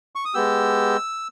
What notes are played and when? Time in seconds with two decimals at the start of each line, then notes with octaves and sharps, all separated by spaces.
0.15 C#6
0.25 D#6
0.34 G#3 B3 G4 E6